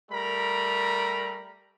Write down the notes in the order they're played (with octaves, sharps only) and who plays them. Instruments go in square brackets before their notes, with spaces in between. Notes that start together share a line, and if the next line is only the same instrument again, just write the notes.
[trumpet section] G3 A3 A#4 A#5 B5